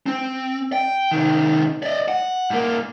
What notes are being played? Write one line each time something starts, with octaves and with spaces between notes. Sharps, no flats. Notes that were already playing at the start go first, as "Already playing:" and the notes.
C4
G5
C3 D#3
D5 D#5
F#5
G2 A#3